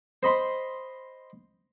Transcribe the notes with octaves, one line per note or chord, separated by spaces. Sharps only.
C5 D#5 B5 C6